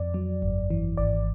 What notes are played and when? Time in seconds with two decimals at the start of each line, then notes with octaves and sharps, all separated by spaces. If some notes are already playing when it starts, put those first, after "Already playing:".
Already playing: F2 D5
0.14 F#3
0.42 G1
0.70 E3
0.97 G#1 D5